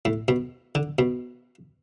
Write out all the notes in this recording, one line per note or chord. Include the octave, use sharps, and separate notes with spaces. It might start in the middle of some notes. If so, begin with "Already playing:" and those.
A2
B2
D3
B2